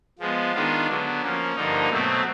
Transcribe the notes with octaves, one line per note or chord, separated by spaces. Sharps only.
F3 G#3 B3
D#3 G#3 B3 D4 F4
D3 F#3 B3
F3 A#3 C#4
G2 D3 F3 A#3 D#4
B2 F#3 A3 C4